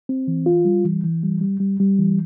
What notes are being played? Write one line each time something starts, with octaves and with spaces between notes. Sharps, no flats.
C4
E3
F4
G3
E3
E3
G3
G3
G3
G3
E3